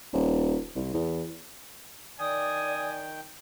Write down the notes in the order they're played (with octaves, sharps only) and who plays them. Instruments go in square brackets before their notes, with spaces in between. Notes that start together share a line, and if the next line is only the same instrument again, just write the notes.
[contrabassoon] D#1
C2
E2
[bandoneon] D#3 G5 [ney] D5 [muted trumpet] G#5 [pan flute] D#6